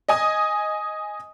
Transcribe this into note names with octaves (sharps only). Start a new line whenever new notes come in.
D#5 G#5 D#6